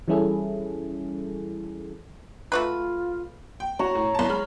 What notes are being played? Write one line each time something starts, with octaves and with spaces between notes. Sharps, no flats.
E3 G3 C#4 E4 G#4 A4
A3 F4 F#4 B4
G5
F#4 C#5 A#5
A2
C2 A5
G#3 B5 F6